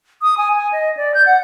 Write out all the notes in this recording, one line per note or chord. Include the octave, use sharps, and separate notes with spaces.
D#6
G#5
G#5
D#5
D5
G6
F#5